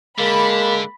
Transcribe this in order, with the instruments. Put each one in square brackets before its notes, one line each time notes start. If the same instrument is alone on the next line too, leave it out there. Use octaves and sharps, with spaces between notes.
[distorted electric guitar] D3 [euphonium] G#3 [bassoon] A#3 [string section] B5